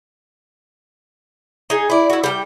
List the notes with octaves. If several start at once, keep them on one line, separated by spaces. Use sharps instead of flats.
D#4 G#4
E4 D5
E4 F#4
G3 F5 G5